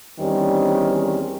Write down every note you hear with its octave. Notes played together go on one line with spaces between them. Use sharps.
E2 D#3 G3 C4 C#4